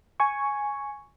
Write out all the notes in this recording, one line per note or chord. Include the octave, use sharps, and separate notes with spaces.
G#5 C#6